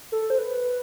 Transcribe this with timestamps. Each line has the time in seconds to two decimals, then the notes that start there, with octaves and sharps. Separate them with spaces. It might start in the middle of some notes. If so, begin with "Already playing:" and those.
0.12 A4
0.30 C5
0.38 B4